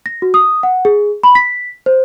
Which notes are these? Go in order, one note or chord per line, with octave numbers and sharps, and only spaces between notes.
A#6
F#4
D#6
F#5
G#4
B5
B6
C5